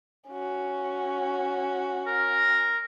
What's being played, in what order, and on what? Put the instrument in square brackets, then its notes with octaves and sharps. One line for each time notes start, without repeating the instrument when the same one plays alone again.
[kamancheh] C#4 F#4
[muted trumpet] A#4